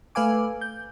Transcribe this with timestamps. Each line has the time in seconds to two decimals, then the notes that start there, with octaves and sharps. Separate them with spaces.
0.15 A3 B4 F5 G#5 D6
0.61 G6